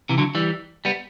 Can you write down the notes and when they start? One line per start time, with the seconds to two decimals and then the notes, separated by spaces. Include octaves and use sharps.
0.09 C3 E3
0.18 D3 F#3
0.35 E3 G3
0.85 G3 B3